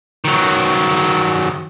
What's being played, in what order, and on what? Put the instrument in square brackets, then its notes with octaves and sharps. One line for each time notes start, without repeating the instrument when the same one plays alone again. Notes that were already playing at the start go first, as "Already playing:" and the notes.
[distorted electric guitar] D#3 F#3